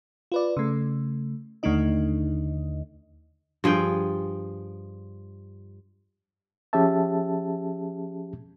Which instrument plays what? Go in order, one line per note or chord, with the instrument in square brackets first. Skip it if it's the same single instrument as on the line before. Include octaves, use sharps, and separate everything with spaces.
[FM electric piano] F4 B4 D5
C#3 A3
D#2 D3 A3 D4 D#4 D#5
[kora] G2 F3 G#4 G5
[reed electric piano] F3 C#4 G4 G#4 E5 A5